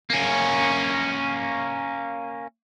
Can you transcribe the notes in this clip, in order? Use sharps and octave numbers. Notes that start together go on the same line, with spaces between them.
A#3 C#4